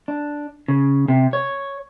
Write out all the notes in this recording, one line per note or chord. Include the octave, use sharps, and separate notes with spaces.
D4
C#3
C3
C#5